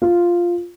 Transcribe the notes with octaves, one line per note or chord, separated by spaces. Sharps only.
F4